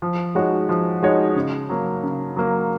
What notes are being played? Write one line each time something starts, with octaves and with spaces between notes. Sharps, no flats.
F3
G#3 D#4 F#4 C#5
F3
G#3 D#4 F#4 C#5
C#3
F#3 A#3
C#3
F#3 A#3